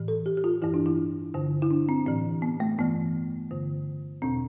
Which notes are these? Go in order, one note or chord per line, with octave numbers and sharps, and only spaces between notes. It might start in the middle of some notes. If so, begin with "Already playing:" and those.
Already playing: A2 E3
A4
G4
G4
F4
G2 E3 E4
D4
E4
G2 D3
E4
D4
C4
A2 E3 C4
B3
A3
G2 E3 B3
G2 D3
E2 B2 C4